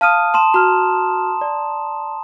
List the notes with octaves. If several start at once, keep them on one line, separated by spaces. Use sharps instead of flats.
F5 A5 D#6 F6 D#7
A5 C6 E7
F#4 A#5 F6
D5